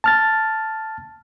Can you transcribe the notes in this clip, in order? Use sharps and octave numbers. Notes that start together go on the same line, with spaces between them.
A5 F6 A6